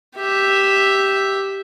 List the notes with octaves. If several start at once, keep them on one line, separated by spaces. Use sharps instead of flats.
G4 E5